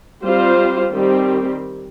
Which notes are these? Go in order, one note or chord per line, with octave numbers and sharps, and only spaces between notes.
G3 C4 F4 C5
D#3 G3 C4 G4